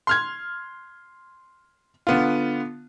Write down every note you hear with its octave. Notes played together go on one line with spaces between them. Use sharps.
C6 F6 G#6
D3 B3 F4